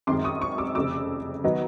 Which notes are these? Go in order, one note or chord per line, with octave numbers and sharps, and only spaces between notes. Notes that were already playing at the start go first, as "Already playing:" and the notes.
F#2 D#3 G#3 C4 C6 D6
C#6 D#6
C#6 D#6
D6 E6
F1 F2 C#3 D6 E6
D#3 F#3 B3 D#4